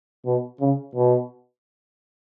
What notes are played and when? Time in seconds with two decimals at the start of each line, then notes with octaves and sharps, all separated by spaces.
0.25 B2
0.60 C#3
0.95 B2